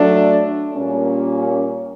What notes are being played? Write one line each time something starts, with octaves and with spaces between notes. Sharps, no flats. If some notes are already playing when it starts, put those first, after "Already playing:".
Already playing: F#3 A3 D4
A#2 G3 A#3 C#4